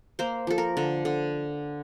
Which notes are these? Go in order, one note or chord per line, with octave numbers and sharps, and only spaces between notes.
A#3 C5
F3 A4
A#4
D3 A4
D3